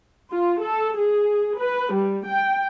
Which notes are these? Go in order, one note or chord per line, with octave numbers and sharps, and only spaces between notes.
F4
A4
G#4
B4
G3
G5